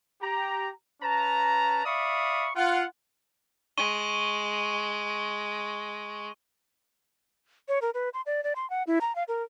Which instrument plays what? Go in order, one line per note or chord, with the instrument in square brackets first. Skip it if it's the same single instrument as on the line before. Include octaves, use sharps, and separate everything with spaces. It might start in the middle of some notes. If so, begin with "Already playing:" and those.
[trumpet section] G4 A#5
C#4 B4 A5 A#5
D5 E5 F5 B5 C#6 D#6
F4 F#5
[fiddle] G#3 [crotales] C#6 D#7 G7
[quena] C#5
A#4
B4
C6
D5
D5
C6
F#5
E4
A#5
F5
A#4